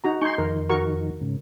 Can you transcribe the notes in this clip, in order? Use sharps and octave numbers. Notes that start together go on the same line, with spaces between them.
D#4 F#4 A#5
D#4 G#5 C6 C#6 G6
F2 D#3 A#4
F#4 A#4 C#6
G#2 C#3